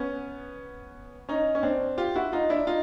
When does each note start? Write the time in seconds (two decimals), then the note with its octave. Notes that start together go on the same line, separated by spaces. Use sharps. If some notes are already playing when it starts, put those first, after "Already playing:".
Already playing: B3 C#4
1.29 C#4 D#4
1.55 C#4
1.63 C4 D4
1.98 F4 G4
2.16 E4 F#4
2.33 D#4 F4
2.49 D4 E4
2.67 D#4 F4